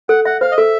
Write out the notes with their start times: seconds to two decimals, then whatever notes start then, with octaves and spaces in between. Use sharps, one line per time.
0.09 A4 F#5
0.25 E5 F#5
0.41 C5 F5
0.52 D#5
0.57 A4 E5